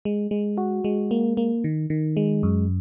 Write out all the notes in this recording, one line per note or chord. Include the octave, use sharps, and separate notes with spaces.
G#3
G#3
F#4
G#3
A#3
A#3
D#3
D#3
G#3
F#2